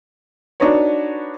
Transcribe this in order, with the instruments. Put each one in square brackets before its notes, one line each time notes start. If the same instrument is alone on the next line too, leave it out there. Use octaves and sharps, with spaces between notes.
[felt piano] D4 D#4 F#4 B4 C#5